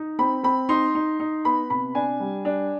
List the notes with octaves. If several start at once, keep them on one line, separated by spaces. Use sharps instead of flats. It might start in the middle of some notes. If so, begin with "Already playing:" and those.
Already playing: D#4
C4 B5
C4 B5
D#4 C6
D#4
D#4
B3 B5
C3 B5
D4 G#5
G3
D4